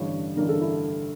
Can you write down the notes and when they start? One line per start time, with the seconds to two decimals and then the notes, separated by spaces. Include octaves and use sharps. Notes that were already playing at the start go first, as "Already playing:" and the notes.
Already playing: A1 G2 D3 C#5
0.37 A1 G2 D3 A#4
0.49 A4
0.60 E4